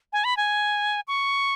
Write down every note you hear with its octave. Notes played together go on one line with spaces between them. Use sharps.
G#5
B5
G#5
C#6